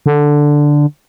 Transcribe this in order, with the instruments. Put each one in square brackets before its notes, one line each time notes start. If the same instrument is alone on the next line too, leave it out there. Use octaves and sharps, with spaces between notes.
[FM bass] D3